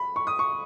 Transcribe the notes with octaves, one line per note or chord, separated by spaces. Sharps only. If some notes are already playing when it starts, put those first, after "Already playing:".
Already playing: B5
C#6
D#6
C#6